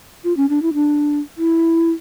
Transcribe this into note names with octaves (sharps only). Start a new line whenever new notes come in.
F4
C#4
D4
E4
D4
E4